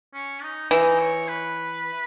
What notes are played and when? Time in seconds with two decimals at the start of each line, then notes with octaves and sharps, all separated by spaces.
0.14 C#4
0.42 D#4
0.71 E3 D#4
1.00 C#5
1.28 B4